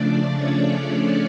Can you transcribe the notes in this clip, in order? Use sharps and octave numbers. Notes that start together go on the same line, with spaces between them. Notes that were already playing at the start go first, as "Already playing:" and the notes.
Already playing: C#3 F3 A3 D4 D5
C#4 C#5